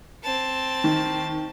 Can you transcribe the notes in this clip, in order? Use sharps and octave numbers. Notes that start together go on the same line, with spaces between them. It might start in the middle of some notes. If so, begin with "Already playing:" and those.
C4 A5
D#3